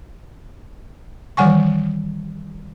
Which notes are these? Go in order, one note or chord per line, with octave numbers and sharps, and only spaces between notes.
D#3 E3 G3 F#5 G#5 C#6